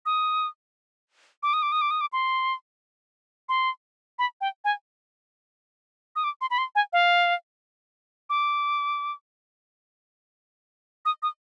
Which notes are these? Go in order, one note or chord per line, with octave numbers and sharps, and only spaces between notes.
D#6
D6
D#6
D6
D#6
D6
D#6
D6
C6
C6
B5
G5
G#5
D#6
D6
C6
B5
C6
G#5
F5
D6
D#6
D#6